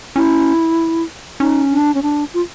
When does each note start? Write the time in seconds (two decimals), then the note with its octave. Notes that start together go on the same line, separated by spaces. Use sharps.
0.16 C#4 E4
1.40 C#4 D#4
1.72 D4
1.94 C#4
2.03 D4
2.34 F4